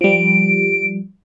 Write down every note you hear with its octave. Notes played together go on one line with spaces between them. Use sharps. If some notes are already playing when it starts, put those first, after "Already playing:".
F3 G3 D7